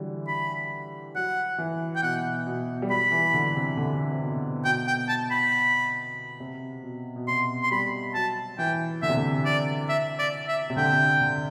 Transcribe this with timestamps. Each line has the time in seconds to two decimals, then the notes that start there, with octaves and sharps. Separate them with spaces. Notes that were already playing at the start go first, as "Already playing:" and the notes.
Already playing: D3 E3 F#3 G3
0.28 B5
1.15 F#3 F#5
1.58 E3
1.96 G5
2.03 B2 F#5
2.46 B2
2.82 G3
2.90 F#3 B5
3.12 E3
3.34 D3
3.56 C3
3.77 D3
4.12 C3
4.22 B2
4.65 B2 G5
4.87 G5
5.09 A5
5.31 B5
6.40 C3
6.83 B2
7.16 B2
7.27 C3 C6
7.63 C6
7.71 G3 B5
8.14 F#3 A5
8.59 E3 G5
9.02 D3 E5
9.09 C3
9.17 D3
9.45 D5
9.89 E5
10.19 D5
10.48 E5
10.70 C3
10.77 D3 G5
11.21 D3